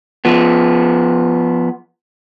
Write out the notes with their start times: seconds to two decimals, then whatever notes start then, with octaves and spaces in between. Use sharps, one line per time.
0.25 F3 B3